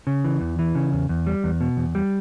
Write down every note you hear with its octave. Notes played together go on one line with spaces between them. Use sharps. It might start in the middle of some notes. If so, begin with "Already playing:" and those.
C#3
E3
E2
E3
C#3
E2
E2
G3
E2
B2
E2
G3